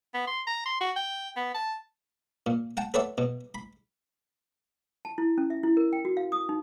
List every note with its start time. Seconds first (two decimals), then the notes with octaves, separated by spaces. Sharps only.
0.14 B3
0.27 C6
0.47 A#5
0.66 C6
0.80 F#4
0.96 G5
1.36 B3
1.54 A5
2.46 A#2
2.77 F#5 G5 A5
2.94 A4 B4 C#5 D5 E5 F#5
3.18 B2
3.55 B5
5.05 A5
5.18 E4
5.38 C#4
5.50 E5
5.63 E4
5.77 A#4
5.93 G5
6.05 F#4
6.17 F5
6.32 D#6
6.49 D#4